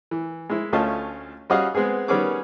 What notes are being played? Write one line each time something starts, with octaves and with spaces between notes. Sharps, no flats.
E3
G#3 E4
D2 A3 C#4 F4 D#5 A5
G3 C#4 F#4 G#4 D#5 F5
G#3 B3 C4 G#4
D#3 G3 B3 C#4 G#4 D6